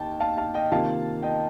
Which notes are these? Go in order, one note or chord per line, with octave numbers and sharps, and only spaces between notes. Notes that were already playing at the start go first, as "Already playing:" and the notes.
Already playing: D#2 D#4 G5 A5
F5 A5
F5 A5
D#5 G5
C3 D#3 A#3 F4 F5 A5
D#5 G5